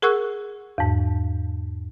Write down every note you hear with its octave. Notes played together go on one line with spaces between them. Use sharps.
G#4 A#4 F#5 C#6 E6 F#6
E2 G#2